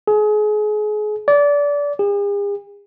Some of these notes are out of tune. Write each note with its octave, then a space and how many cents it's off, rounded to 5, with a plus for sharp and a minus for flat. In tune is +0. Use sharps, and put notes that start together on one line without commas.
G#4 +30
D5 -25
G#4 -45